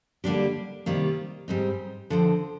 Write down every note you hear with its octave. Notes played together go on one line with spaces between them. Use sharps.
D3 G3 A#3 D4 G4
C3 D#3 G3 A#3 F4
G#2 G3 C4 D#4
D3 F3 C4